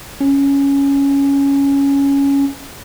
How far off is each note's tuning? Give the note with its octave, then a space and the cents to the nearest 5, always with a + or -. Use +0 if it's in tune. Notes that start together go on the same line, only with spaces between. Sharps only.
C#4 +5